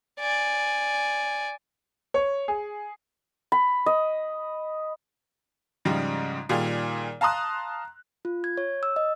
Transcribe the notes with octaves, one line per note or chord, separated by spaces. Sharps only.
D5 G#5
C#5
G#4
B5
D#5
G#2 C#3 F3 G3 G#3
A#2 D#3 G3 F4 G#4
F5 A5 A#5 C6 D#6 F#6
F4
G#6
C#5
E6
D#5